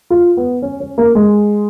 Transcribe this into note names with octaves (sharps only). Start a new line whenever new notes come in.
F4
B3
C#4
C#4
A#3
G#3